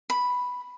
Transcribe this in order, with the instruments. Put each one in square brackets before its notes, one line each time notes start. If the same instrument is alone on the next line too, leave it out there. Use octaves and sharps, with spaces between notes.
[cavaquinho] B5